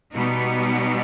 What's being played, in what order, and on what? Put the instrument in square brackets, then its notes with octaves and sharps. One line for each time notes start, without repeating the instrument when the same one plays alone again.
[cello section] B2 G3 B3 D#4